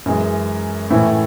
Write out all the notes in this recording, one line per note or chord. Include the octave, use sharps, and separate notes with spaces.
F#2 E3 G#3
A2 E3 A3 C#4 E4